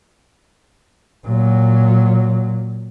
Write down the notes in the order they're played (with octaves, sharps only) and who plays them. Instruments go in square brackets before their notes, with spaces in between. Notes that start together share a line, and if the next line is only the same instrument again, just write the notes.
[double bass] A#2 F#3